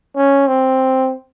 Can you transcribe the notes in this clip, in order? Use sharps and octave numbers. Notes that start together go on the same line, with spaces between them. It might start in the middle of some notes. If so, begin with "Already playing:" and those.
C#4
C4